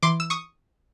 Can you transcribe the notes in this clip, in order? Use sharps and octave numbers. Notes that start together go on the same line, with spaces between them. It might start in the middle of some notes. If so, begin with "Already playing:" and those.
E3 C6 D6
E6
C#6 D#6